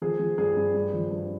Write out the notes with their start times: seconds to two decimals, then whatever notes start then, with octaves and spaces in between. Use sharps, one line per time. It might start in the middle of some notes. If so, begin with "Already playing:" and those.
0.02 F3 G#4
0.19 F3
0.38 G2 G#4
0.57 G2
0.74 G2
0.94 F3
1.11 G2